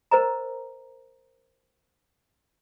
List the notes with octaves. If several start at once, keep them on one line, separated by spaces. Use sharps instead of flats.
A#4 C5 D#5 A#5